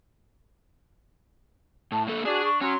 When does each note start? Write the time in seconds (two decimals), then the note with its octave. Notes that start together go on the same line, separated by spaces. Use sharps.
1.92 A2 A5
2.07 D3 A#3 A4 B4
2.25 D4 F#4 G#4
2.44 C#6
2.61 F#3 C#4 C6